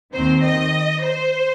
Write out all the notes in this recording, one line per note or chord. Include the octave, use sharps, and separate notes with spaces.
D#2 D#3 C4 C5
D#5
C5